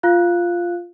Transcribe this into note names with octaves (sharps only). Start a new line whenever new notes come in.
F4 F5 F#6